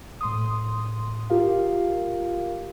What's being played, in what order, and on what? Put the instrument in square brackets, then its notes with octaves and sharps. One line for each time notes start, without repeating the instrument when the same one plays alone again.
[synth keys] A2 C6 D#6
F4 G4 A#4 F5